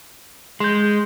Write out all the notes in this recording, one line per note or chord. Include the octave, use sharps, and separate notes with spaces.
G#3 C6 G6